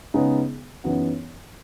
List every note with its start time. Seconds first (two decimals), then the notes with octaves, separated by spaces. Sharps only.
0.14 C#3 G#3 B3 D#4 G#4
0.84 F#2 E3 B3 D#4 F#4